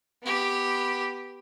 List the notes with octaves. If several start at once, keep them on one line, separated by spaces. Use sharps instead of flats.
B3 G4